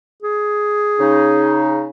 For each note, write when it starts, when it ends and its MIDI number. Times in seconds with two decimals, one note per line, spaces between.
0.22 1.79 68
0.99 1.90 49
0.99 1.90 63